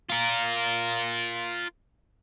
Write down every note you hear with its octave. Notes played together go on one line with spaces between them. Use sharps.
F4 A#4